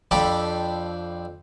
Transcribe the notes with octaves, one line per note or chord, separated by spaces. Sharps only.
F2 D4 G4 A4 D5 B5